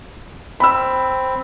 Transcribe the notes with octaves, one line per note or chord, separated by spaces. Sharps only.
C4 B5 E6